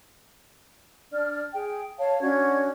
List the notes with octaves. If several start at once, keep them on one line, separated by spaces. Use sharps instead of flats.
D4 D5 F6
G#4 G5
C#5 F5 A5
C#4 D4 F#4 G#6